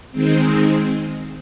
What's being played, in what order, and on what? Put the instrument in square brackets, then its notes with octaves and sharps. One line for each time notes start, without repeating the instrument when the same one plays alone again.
[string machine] D#3 G#3 C4